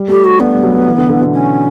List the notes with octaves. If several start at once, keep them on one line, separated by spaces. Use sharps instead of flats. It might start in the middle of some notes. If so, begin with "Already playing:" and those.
Already playing: G3
A3 G4
F#4
B3 D4
G3
F#3
G3
E3
D3
D3
B2
C#4